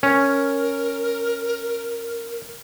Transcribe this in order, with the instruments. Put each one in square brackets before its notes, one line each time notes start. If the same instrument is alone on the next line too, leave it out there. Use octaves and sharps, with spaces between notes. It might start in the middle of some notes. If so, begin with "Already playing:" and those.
[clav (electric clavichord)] C#4 [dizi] A#4